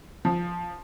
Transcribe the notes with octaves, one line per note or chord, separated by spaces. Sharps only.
F3